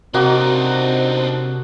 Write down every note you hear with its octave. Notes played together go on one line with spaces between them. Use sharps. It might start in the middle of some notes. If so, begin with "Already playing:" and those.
C3 A#3 C4 D4 D#4 F#4 D#5